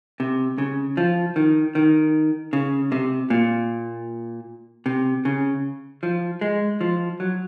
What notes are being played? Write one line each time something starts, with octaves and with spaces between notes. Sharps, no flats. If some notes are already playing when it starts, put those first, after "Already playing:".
C3
C#3
F3
D#3
D#3
C#3
C3
A#2
C3
C#3
F3
G#3
F3
F#3